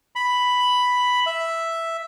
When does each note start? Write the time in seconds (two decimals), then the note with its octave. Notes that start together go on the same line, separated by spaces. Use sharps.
0.16 B5
1.26 E5